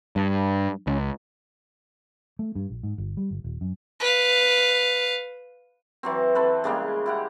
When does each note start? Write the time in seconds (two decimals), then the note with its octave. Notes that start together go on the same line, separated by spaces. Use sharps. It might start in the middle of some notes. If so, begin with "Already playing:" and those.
0.16 G2
0.87 C#2
2.39 A3
2.55 G2
2.70 A#1
2.83 G#2
2.98 G1
3.17 G3
3.31 G1
3.44 D#1
3.61 F#2
4.00 B4 F5
6.03 E3 F#3 C4
6.35 C4 A4 B4
6.64 C#3 G3 G#3 A#3
7.06 E4 G4 F#5